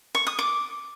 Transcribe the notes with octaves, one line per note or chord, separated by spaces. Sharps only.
C#6
D#6
D6